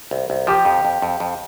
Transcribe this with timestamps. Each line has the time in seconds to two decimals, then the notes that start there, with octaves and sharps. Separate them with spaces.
0.11 C2
0.30 C2
0.47 F3 G4
0.65 F2
0.85 F2
1.02 F2
1.20 F2